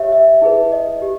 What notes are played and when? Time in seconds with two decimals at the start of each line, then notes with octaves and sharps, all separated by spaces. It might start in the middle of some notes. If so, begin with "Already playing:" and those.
Already playing: G4 C#5 E5
0.12 E5
0.42 E4 G#4 B4
0.72 D#5
1.02 G4